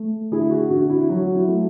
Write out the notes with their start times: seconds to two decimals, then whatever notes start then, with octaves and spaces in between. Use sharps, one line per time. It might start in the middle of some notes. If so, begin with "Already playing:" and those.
Already playing: A3
0.31 D3 E4 G#4
0.51 F#4
0.70 D3 F#4
0.90 E4
1.09 F#3 F#4
1.36 E4
1.48 A3